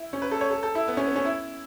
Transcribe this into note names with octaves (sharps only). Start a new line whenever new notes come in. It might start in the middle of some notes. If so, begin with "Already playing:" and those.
Already playing: E4
C#4
B4
A4
C#5
A4
A4
E4
B3
C#4
B3
C#4
E4